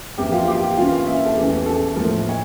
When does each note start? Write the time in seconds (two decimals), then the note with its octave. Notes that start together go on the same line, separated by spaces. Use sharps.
0.18 F2 E3 A#3 E4 G4 G5
0.32 F4 F5
0.47 G4 G5
0.77 E3 A#3 C#4 F4 F5
1.07 E4 E5
1.25 A4
1.36 E2 E3 A3 C#4 G4
1.66 A4
1.96 A2 F3 A3 A#3 A#4
2.29 C#5